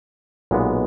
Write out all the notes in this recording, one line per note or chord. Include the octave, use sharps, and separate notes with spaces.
B1 A#2 G#3 B3